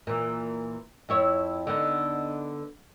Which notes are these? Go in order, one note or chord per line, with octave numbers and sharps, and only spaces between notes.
A#2 E3
F2 E4 C#5
D3 B3 D#4